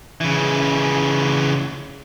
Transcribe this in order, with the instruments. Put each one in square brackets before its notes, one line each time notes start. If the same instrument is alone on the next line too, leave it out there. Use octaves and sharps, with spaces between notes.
[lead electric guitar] C#3 E3